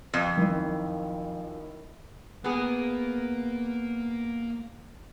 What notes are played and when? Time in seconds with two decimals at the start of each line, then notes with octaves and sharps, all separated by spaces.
0.14 F2
0.37 F#2 D#3 E4
2.44 A#3 B3 G#4